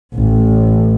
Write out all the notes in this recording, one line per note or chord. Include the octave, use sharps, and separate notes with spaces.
A1